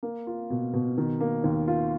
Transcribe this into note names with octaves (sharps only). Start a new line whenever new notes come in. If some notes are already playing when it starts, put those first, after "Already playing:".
A#3
F4
B2
B2
D#3
A#3
D#2
F4